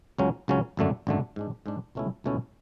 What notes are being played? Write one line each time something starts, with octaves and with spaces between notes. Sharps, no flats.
C#2 C#3 F#3 C#4
C#2 C#3 F#3 C#4
G#1 F#2 D3 A3 D4
G#1 F#2 D3 A3 D4
G#2 G#3 D4
G#2 G#3 D4
C#2 B2 A3 C#4 E4
C#2 B2 A3 C#4 E4